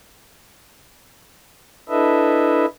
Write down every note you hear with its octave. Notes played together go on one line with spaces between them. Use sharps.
D4 E4 A4 B4 D#5 E5